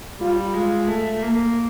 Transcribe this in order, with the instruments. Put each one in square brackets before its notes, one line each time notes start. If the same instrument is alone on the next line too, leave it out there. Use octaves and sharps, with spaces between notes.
[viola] G3 [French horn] F4
[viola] G#3 [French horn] F4
[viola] A3
A#3